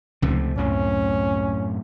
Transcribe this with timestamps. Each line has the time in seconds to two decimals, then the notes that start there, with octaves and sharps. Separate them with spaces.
0.22 C#2 C3 F3 A3
0.57 F#2 A2 C4 C#4